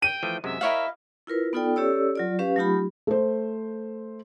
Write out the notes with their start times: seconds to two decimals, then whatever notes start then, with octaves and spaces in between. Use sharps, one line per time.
0.02 G5 D#7
0.23 E3 F3 A3
0.44 F#2 C3 G#3 E5
0.61 E4 A#4 C#5 D#5 F5 F#5
1.27 E4 F4 A#4 B4
1.53 B3 D#4 F4 A4 D5 G5
1.76 C#4 G4 A4 C#5 D5 E6
2.16 F#3 F4 D5
2.39 C#4 G4 B4 F5
2.56 F#3 A3 D#4 F4 G4 B5
3.07 A3 C5